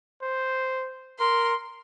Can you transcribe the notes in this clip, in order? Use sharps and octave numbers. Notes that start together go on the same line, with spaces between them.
C5
A#4 C6